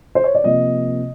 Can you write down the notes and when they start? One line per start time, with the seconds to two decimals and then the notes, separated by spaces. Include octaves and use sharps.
0.15 C5
0.24 C#5
0.35 D5
0.44 C3 F3 A#3 D#5